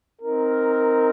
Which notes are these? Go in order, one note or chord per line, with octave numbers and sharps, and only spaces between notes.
C4 D#4 A#4